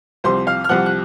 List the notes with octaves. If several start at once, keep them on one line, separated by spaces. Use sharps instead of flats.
C2 C3 F3 C5 C6
F5 F6
F6
C2 C3 F3 F#5 F#6
F#6